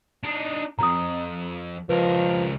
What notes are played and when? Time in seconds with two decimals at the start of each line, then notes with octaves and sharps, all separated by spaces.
0.24 D4 D#4
0.79 B1 F2 A#5 D#6
1.89 C#2 F3 A#4 B4